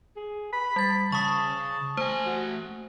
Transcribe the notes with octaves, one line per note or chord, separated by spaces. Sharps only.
G#4
B5
G3 A6
C#3 A5 C#6 D#6
A3 C5 G#5
F#4